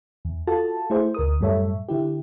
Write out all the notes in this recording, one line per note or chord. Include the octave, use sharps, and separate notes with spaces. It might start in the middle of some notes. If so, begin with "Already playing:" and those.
E2
F4 F#4 A4 A5
A3 E4 G#4 C5
D2 A#4 D#6
F#2 A2 G3 A4 C#5 E5
D3 E4 G4